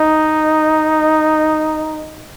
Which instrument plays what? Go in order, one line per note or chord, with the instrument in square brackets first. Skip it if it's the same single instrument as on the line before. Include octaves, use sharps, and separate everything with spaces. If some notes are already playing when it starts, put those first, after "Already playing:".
Already playing: [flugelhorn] D#4